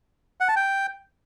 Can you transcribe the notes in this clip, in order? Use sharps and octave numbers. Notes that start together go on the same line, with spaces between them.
F#5
A5
G5